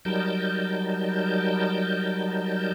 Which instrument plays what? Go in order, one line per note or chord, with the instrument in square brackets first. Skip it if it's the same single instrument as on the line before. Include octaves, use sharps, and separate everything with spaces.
[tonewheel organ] F#3 G3 D#4 A#4 A5 G6